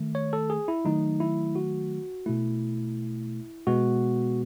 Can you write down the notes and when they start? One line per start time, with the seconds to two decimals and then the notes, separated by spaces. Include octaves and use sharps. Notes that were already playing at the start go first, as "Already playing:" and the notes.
Already playing: D#3 A3
0.15 C#5
0.33 A4
0.50 G#4
0.68 E4
0.85 D#3 F#3 A3 D#4
1.20 E4
1.56 F#4
2.26 B2 A3 E4
3.67 B2 G#3 B3 F#4